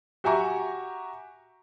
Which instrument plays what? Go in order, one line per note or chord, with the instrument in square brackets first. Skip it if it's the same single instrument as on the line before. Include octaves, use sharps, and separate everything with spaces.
[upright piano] F#4 G4 E5 G#5 A#5 C#6